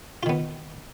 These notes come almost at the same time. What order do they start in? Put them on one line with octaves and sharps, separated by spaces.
F4 D#3 B3